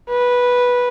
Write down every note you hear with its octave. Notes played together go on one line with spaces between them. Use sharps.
B4